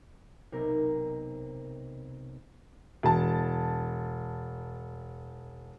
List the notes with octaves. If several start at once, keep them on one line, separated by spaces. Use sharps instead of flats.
B1 C3 A#4
E1 A5